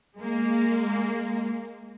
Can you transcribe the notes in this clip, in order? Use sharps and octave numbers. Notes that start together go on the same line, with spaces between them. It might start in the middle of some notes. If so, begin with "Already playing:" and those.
G#3 A#3